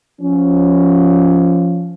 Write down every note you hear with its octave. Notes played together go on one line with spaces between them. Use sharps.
F3 C#4